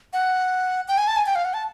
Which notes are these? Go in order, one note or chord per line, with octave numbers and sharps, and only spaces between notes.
F#5
G5
G#5
A5
G#5
G5
F5
F#5
A5